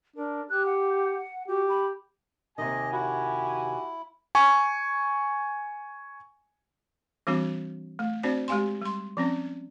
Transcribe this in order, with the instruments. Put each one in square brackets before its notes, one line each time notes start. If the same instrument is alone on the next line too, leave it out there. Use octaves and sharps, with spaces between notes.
[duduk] D4 [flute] A#4
[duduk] G4 [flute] F#6
[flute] F#5
[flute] F#4 [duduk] G4
[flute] B5
[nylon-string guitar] D#2 C3 D#3 [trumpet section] G4 G#5 [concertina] D#5
[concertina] E4 [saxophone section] F#4
[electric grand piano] G#5 C#6
[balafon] E3 G3 C4 D4 F#4
A3
C4 D4 F#4 C5 D5
G#3 G4 F5 G#5 C6
G3 C6
F3 C4 C#4